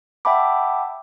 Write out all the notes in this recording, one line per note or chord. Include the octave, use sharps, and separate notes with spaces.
E5 F#5 G5 A5 B5 D6